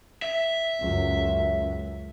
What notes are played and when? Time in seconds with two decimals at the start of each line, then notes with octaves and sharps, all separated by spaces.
0.22 E5
0.80 C#2 F#2